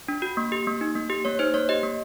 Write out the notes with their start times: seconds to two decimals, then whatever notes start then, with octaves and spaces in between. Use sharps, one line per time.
0.08 D4
0.22 F#4
0.37 A#3
0.52 G4
0.67 A#3
0.81 D#4
0.95 A#3
1.10 G4
1.25 A#3 C#5
1.39 D#4 C5
1.54 A#3 C#5
1.69 G4 D#5
1.83 A#3